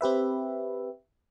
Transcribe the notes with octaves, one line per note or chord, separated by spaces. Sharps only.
C4 G4 B4 E5